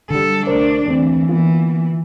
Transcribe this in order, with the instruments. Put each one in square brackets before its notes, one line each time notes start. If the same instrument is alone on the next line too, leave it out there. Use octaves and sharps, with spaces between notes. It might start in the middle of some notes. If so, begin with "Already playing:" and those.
[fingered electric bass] D3 [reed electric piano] F#3 G3 [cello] A4
[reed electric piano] C2 A#4 C5 [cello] A3 D4
[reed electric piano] E2 A3 C4 [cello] E3
[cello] E3 [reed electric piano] A#3 B3 F4